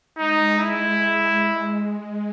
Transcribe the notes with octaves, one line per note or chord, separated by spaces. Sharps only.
G#3 D#4
E4